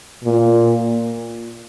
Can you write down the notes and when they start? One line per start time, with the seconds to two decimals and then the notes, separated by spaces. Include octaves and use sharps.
0.24 A#2